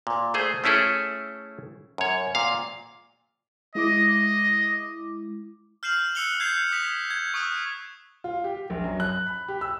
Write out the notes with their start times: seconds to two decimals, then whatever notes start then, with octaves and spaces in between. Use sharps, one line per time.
0.07 A#2
0.34 A3 G#4 C5
0.64 A3 C#4 E4 G#4 A4
1.98 F#2 C#5
2.35 A#2 F5
3.75 G#3 E4 D#5 D6
5.83 F6 G6 C7 E7 F#7
6.15 E6 F#6 C#7 F7 G7
6.40 G6 G#6 C7 F7
6.72 D#6 B6 F7
7.11 G#6
7.34 C#6 D#6 E6 F#6
8.24 F4
8.44 G4
8.70 A#1
8.84 F#2
9.00 F#6
9.26 B5
9.48 G4
9.61 E6